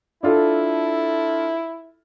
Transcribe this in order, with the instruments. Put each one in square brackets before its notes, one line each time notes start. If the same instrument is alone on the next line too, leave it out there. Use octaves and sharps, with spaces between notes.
[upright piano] D4 F4 A4 [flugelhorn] E4